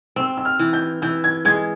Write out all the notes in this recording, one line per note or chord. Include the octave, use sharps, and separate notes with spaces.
C4 E6
E6
F6
E3
G6
E3 G6
G#6
G#3 G#6